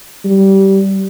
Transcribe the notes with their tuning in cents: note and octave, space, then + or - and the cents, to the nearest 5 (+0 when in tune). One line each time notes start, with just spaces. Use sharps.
G3 -20